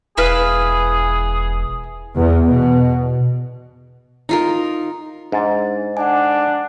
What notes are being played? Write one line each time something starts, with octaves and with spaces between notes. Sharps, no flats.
E1 E4 G#4 B4 F5
E2
B2
D#4 F4 A#4
G#2 D4 A6
D4 F#5 G#5